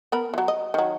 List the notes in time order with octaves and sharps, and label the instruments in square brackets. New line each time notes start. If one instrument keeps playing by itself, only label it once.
[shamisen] B3 A#4 B5
E3 F#3
D#5
D#3 F#3